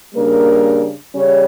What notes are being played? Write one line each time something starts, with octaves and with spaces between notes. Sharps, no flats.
C#3 G3 A#3 D4 A#4
C#3 G3 C#4 C#5